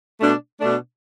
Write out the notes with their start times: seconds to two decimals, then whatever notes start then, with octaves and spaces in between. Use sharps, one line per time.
0.18 B2 A3 D4
0.60 B2 A3 D4